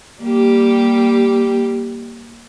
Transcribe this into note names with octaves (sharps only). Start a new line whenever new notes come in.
G3 A#3 G4